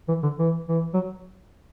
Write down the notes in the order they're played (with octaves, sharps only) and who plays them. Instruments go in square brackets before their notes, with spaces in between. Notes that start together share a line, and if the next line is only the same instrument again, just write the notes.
[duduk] E3
D3
E3
E3
F#3